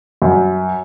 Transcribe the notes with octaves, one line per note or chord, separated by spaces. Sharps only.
F#2